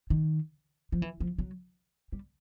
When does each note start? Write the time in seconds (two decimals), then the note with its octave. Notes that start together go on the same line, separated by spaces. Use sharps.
0.10 D#3
0.92 F3
1.02 E3
1.20 F3
1.38 F#3
2.12 G3